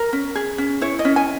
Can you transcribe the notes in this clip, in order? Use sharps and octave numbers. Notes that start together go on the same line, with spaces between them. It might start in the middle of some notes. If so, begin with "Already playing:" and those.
Already playing: A#4
C#4
G#4
C#4
E4 C#5
D#5
C#4
G#5